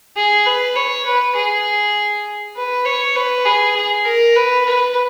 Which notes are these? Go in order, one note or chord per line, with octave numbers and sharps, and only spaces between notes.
G#4
B4
C#5
B4
G#4
B4
C#5
B4
G#4
G#4
A#4
B4
B4